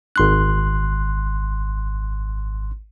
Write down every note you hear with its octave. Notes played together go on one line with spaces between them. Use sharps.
G#1 C6 F#6